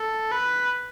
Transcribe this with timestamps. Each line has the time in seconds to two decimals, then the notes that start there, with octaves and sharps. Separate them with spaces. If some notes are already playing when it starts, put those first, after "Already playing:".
Already playing: A4
0.32 B4